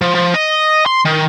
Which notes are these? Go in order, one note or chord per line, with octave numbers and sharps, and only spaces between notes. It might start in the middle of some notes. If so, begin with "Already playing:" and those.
F3
F3
D#5
C6
D#3